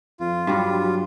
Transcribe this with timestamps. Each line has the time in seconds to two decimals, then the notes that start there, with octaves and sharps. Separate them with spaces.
0.20 F2 F4
0.47 G2 F#3 G3 D4
0.84 F#3